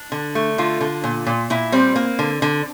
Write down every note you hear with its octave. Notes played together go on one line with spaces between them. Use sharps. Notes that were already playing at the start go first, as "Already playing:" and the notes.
Already playing: D4
D3
A3
D3 F4
D3
A#2
A#2
A#2 E4
G3 C4
A#3
D3
D3